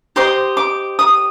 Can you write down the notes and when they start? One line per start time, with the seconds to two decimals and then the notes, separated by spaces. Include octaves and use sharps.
0.16 G4 C5 D#5 C6
0.57 D6
0.99 D#6